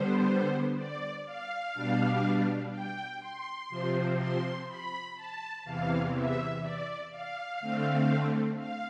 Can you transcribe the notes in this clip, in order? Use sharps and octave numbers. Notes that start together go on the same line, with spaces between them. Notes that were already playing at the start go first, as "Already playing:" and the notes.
Already playing: D3 G3 B3 C5
D5
F5
B2 G3 D4
G5
C6
C3 F3 C4
C6
B5
A5
E2 C3 E3 F5
E5
D5
F5
D3 A3 C4
F5